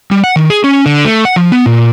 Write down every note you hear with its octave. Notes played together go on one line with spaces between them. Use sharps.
G3
F#5
D#3
G#4
C#4
D3
A3
F#5
F3
B3
A#2